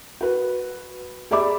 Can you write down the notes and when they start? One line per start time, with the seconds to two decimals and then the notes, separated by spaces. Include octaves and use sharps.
0.21 F#4 B4
1.31 G4 G#4 D5 E5 B5 D6